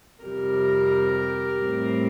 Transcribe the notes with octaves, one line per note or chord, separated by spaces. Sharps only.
F2 C3 G3 G4 A#4
A2 G3 C4